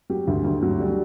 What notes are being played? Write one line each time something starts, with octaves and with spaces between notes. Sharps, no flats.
F#3 G4
D2
D2
F#3
G3